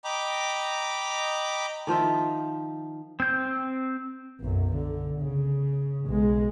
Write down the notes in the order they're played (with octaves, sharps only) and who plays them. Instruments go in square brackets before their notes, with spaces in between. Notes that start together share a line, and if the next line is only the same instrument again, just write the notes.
[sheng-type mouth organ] D#5 G5 A#5 B5 D6
[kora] D#3 F3 F4 E5
[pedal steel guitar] C4 G6
[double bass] B1 F#2
D3
C#3
B1 G#3